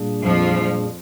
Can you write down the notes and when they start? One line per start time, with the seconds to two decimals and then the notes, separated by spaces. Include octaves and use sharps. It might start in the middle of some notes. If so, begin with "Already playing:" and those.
Already playing: A#2 G3 A#3 D4 G#4
0.22 F2 F3